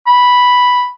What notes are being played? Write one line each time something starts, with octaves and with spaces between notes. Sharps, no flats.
B5